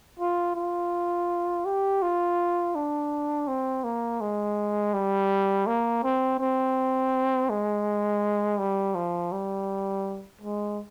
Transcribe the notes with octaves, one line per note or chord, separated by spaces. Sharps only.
F4
F4
G4
F4
D4
C4
A#3
G#3
G3
A#3
C4
C4
G#3
G3
F3
G3
G#3